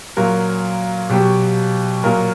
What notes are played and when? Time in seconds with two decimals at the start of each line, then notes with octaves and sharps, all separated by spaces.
0.17 A#2 F#3 A#4
1.09 B2 F#3 G4
2.03 A#2 F#3 A#4